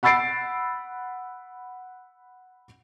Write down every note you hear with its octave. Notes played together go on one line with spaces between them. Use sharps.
F#5 B5 E6 A6 C7 D7